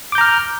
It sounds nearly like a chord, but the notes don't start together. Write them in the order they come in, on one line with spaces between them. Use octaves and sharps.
D6 G6 A#5 F6